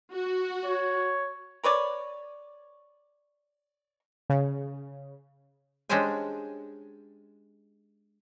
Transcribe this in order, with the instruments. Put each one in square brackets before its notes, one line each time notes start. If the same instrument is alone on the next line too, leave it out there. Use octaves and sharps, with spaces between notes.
[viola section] F#4
[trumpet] C#5
[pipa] A#4 B4 C#5 D5
[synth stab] C#3
[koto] G#3 C#4 D4 G4 C5 G#5